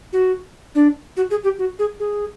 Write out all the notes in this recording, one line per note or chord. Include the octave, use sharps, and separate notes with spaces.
F#4
D4
F#4
G#4
G4
F#4
G#4
G#4